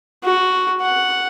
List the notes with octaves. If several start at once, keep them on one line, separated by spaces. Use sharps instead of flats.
F#4
F#5